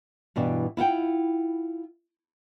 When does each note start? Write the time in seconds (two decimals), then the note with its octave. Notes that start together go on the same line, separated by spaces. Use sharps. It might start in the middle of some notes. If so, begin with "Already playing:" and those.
0.36 G2 B2 E3 D5
0.77 E4 F4 F#5 G5